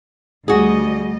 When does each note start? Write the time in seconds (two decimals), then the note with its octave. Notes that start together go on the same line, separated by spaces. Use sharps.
0.48 D2 G3 F#4 G#4 D#5